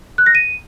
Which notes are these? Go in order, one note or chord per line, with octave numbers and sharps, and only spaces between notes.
F#6
A#6
D#7